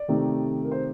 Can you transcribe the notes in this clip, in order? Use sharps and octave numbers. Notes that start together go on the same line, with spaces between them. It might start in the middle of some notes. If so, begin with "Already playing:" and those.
Already playing: D5
C3 D#3 A3 C4 D#4
A#4
C5